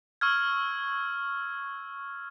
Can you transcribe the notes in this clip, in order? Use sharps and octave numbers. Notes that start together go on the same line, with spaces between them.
C#6 E6 F6 G#6